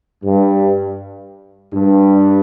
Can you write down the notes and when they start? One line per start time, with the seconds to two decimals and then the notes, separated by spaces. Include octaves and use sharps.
0.22 G2
1.72 G2